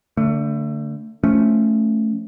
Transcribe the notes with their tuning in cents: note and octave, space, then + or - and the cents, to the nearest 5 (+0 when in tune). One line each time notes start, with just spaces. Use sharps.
D3 -15 A3 +25
F3 +0 A3 +0 C#4 +0